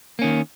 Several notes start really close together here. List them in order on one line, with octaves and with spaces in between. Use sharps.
A#3 C#4 D#3